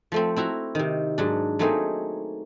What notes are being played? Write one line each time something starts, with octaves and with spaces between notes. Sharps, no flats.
F3 A3 C4
C4 E4 F#4 A#5
C3 D#3
G#2 F#3 D4
F#3 A3 A#3 C4 D#4 G#4